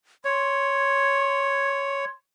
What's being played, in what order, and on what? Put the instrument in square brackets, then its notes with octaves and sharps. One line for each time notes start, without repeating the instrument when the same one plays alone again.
[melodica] C#5 [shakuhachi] C6